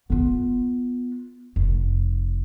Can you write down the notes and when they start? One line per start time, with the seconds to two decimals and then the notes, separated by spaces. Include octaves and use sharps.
0.10 B3 F4
1.56 F1